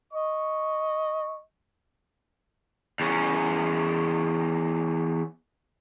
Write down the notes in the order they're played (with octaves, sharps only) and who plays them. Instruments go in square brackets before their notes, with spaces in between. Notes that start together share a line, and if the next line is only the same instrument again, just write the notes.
[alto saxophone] D#5 [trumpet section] C#6
[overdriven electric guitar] E2 C#4